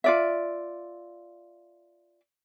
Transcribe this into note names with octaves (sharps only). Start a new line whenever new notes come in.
F4 D5 E5